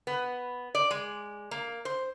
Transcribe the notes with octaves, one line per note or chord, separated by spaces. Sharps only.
B3
D5
G#3
A#3
C5